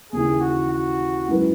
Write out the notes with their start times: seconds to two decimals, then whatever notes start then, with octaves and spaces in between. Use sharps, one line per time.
0.12 D#2 C#3 E3 G#4
0.41 F#4
0.70 F#4
1.28 G#2 F#3 C#4 E4 B4